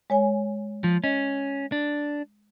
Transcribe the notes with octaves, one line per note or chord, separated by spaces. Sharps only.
G#3 C#5 G#5
F3
C#4 D#5
D4